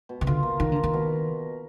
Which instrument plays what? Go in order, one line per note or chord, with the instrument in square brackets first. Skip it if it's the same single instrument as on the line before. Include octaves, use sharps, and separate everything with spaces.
[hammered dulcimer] B2
[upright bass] D#3
[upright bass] D3 [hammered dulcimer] F4
[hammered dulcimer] A#3
[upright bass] D#3 [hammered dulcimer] A#4
[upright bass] D3 [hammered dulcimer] A#4
[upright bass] D#3
[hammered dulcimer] B2